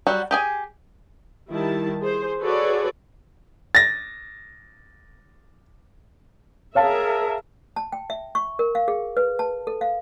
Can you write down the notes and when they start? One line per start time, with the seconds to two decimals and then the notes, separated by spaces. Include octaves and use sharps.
0.07 F#3 G3 F#4
0.31 G4 G#4 G#5
1.49 D#3 G3 E4 A5
2.01 G#4 C5
2.42 F#4 G#4 A4 B4 C#5 D5
3.75 A6 A#6
6.75 G#4 A#4 C#5 E5 F5 A5
7.76 A5
7.92 G5
8.10 E5
8.35 C#6
8.59 A#4
8.75 F5
8.88 G#4
9.17 B4
9.39 A5
9.67 A4
9.81 F5